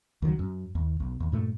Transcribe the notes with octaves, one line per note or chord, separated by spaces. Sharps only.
C#2 D#3 F3 F#3
F#2
D#2
B1
D#2
G2 A#2 A3